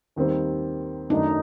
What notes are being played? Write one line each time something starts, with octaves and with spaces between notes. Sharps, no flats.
D#2 D#3 G3 C4
F#2 D#3 F#3 A3 D4 D#4